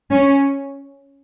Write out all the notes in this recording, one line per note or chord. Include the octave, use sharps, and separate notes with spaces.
C#4